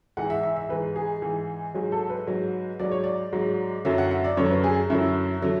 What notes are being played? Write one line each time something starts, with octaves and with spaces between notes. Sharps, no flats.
G#2 E3 F#5
E5
E5
E5
G#2 E3 B4
G#4
G#2 E3
G#2 F#3 G#4
A4
B4
G#2 F#3
G#2 F#3 D5
C#5
D5
G#2 F#3
F#2 D3 F#3 E5
F#5
E5
D5
F#2 D3 F#3 C#5
B4
G#4
F#2 D3 F#3 E4
D3 F#3